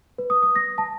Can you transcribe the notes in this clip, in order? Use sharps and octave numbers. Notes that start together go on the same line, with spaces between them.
B4
D#6
D#6
A#6
A5